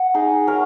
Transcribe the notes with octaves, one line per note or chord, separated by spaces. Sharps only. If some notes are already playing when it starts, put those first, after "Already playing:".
Already playing: F#5
D#4 G#4
F#3 A#4